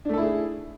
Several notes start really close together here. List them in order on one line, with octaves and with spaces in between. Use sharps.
D4 A3 A4 E4 G#4